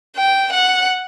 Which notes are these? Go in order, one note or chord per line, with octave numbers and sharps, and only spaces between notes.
G5
F#5